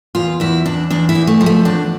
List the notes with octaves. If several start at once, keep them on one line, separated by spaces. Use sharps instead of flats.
E2 F4
E2 E4
E2 D4
E2 D4
E4
E2
A3
F3
A3
E2 D4